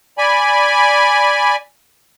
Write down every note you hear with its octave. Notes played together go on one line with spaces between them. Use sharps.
D5 G#5 B5